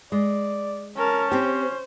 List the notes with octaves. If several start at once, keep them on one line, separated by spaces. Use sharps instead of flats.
G#3 D5
C#4 A#4 A5
C4 G4 C5